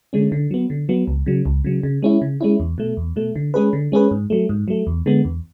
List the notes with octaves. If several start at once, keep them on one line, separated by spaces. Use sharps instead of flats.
D3 G#3 C#4
D3
F#3 B3
D3
F#3 B3
C#2
C#3 F#3
C#2
C#3 F#3
C#3
G#3 C#4 E4
C#3
G#3 C#4 E4
E2
B2 A3
E2
B2 A3
D3
G#3 C#4 G#4 B4
D3
G#3 C#4 G#4 B4
G#2
F#3 A3
G#2
F#3 A3
E2
D3 G#3 B3
E2